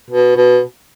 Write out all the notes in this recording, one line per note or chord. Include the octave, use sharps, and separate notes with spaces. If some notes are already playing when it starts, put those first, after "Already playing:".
B2
B2